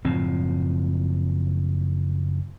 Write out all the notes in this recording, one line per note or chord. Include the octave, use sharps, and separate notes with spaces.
F#1 A2 F3 C4